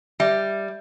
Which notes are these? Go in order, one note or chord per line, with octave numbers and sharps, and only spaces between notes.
G3 E5